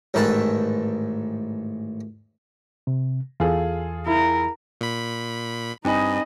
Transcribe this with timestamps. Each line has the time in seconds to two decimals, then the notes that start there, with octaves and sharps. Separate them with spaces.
0.14 A1 G#2 D#3 B4 E5 A5
2.87 C3
3.40 E2 F4 G#4 A4
4.07 E4 A#4
4.81 A#2 B5
5.85 G2 C4 D#4 D#5 G#5 B5